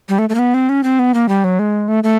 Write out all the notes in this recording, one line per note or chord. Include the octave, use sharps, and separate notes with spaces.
G3
A3
A3
A#3
B3
C4
C#4
C4
B3
A#3
G3
F#3
G#3
A3
A3